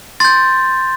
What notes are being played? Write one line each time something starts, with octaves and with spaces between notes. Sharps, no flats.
C6 G6 A6